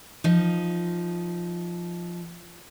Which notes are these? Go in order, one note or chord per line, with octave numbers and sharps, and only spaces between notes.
F3 D#4